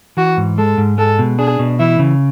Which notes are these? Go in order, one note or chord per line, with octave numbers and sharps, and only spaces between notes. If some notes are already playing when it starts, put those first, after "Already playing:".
E3 F#4
G#2
G#3 A4
G#2
G#3 A4
B2
D4 G#4
B2
E3 E4
C#3